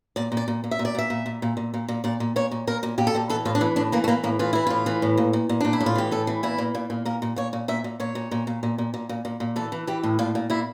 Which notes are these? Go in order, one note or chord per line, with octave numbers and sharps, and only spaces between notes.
A#2 D5
A#2
D5
A#2
A#2
E5
A#2
D5
A#2 E5
A#2
A#2
A#2
A#2
A#2
A#2
A#2 D5
A#2
A#2 C#5
A#2
A#2 A#4
A#2
A#2 G4
A4
A#2 G4
E3 A4
A2 F4
D4
E3 E4
A2 D4
E3 A#3
A3
E3 A#3
A2 A#3
E3 F4
E3 E4
A2 F4
E3
A2
A#2
A#2
A#2
A#2 D4
E4
A2
F4
E3 G4
A2 A4
E3
A#2 E4
A#2
A#2
A#2
A#2 A#4
A#2
A#2 C#5
A#2
A#2 E5
A#2
A#2 C#5
A#2
A#2
A#2
A#2
A#2
A#2
A#2
A#2
A#2
E3 A4
E3
E3 G4
A2
A#2 F4
A#2
A#2 E4